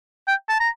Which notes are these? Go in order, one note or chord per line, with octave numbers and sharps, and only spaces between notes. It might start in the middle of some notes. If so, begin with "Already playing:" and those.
G5
A5
A#5